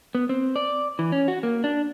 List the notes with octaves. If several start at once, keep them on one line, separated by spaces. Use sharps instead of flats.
B3
C4
D5
E3
C#4
F#4
A#3
D4